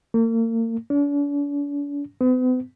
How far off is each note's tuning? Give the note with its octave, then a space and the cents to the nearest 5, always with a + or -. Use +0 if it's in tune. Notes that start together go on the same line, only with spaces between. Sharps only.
A#3 -40
D4 -45
B3 +45